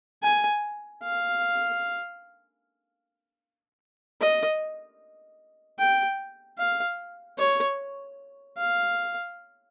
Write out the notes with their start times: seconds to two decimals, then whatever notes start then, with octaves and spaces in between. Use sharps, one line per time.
0.23 G#5
1.03 F5
4.21 D#5
5.79 G5
6.59 F5
7.39 C#5
8.57 F5